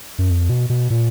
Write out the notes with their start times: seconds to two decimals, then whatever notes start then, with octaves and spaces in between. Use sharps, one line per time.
0.19 F#2
0.29 F2
0.49 B2
0.70 B2
0.90 A#2